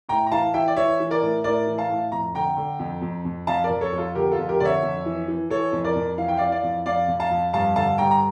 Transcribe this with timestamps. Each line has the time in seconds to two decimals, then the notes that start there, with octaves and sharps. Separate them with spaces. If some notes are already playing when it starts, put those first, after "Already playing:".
0.09 A2 G5 A#5
0.27 A#5
0.32 E3 F5 A5
0.54 E3 E5 G5
0.68 D5
0.76 E3 C#5 E5
1.00 E3
1.11 A#4 D5
1.22 A2
1.44 A2 A#4 D5
1.67 E3
1.78 F5 A5
1.90 A2
2.12 F2 A#5
2.35 D3 G5 A#5
2.57 D3
2.79 F2
3.02 F2
3.25 F2
3.47 F2 F5 A5
3.64 A#4 D5
3.70 F2
3.81 A4 C#5
3.93 F2
3.98 F4 A4
4.15 D3 G4 A#4
4.31 F4 A4
4.38 F2
4.48 G4 A#4
4.60 D3 C#5 D5 E5
4.82 F2
5.06 E3
5.28 E3
5.50 E3 A4 C#5
5.72 F2
5.84 A#4 D5
5.96 F2
6.17 E3 F5
6.28 G5
6.37 E3 D5 F5
6.52 D5 F5
6.63 F2
6.86 F2 D5 F5
7.08 F2
7.20 F5 A5
7.31 F2
7.53 G2 F5 A5
7.76 D3 F5 A5
7.98 G2 G5 A#5
8.11 A#5